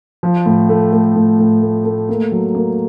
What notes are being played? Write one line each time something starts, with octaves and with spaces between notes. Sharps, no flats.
F3
A2
A3
A3
A2
A2
A3
A3
A#3
F#3
A#3